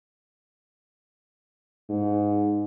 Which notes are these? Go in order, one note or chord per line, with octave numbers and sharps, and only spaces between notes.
G#2